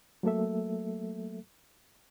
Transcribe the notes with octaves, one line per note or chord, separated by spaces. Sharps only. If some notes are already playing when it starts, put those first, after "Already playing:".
F#3 A3 A#3 A4 E5